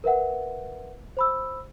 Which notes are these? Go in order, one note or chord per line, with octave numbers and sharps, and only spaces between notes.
A#4 B4 E5 F#5
C5 B5 E6